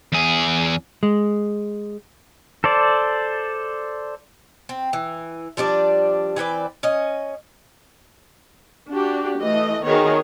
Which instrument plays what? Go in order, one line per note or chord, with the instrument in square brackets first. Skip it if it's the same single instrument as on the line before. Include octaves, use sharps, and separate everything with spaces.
[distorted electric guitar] E2 G#4
[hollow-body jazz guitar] G#3
[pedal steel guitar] A4 C5 D5
[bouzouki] C4
E3
F3 G3 D4 D5
E3 C4 B4 D5
C#4 D#5
[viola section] D4 F#4 G4
E3 A3 D#5
D#3 B3 F#4 G#4 A#4 C#5